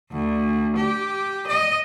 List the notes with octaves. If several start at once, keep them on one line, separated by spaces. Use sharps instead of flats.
D2
G4
D#5